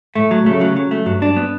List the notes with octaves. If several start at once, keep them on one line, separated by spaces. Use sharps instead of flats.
A2 A3
F#3
C#3 A3
F#3
F#3
A3
G2 F#3
D4
B3